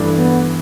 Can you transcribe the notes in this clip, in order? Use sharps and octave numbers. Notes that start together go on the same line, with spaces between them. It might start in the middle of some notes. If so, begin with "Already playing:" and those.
Already playing: G2 E3 A3 D4
B3